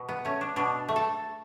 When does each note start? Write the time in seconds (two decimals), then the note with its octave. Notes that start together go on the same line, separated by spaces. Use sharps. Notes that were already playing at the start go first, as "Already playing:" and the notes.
Already playing: B2
0.09 B3
0.25 A3 C#4
0.41 D4
0.56 B2 D4
0.89 A3
0.96 A4